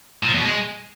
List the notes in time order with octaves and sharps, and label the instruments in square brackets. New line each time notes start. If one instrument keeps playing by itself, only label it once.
[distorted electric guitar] A#2
F3
E2
B2
G#3